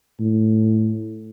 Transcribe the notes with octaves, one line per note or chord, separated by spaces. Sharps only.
A2